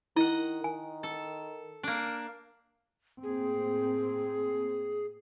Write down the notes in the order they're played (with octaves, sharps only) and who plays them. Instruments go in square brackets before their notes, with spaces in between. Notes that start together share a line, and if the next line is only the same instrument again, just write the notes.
[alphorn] D#3 [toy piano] E4 [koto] D#5 F#5
[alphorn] D#3 [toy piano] G#5
[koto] A4
A#3 D4
[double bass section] A2 A#3 C4 [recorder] G#4